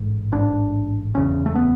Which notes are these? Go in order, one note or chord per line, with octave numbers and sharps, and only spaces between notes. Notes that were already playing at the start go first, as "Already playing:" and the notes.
Already playing: A1 G#2
A1 G#2 D4
F#1 E2 C#3 C#4
A3
B3